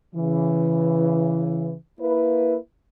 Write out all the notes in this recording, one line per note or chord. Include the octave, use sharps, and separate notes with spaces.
C#3 E3
A#3 E4 B4